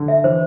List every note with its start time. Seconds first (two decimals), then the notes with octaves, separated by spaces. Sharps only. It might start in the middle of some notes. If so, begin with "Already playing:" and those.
Already playing: D3
0.08 E5
0.24 E3 C5